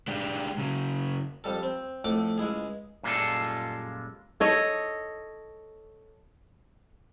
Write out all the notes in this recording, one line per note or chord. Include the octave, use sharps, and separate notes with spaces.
G#3 D4 G4
C#3 F#3
F2 G3 A4
C4
F2 A2 A3 D6
C#2 G#3 E4 G#4
F#2 A#2 G3 G#3 F4 A4
A4 C#5 D#5